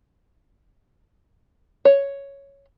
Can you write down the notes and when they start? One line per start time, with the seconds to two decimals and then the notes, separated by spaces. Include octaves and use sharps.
1.85 C#5